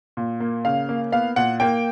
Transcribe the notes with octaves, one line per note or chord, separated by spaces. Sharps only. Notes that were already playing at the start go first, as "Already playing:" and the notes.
A#2
A#3
C#3 F5
A#3
B3 F5
A#2 F#5
A#3 G5